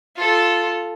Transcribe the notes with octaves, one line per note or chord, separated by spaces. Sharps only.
F4 A4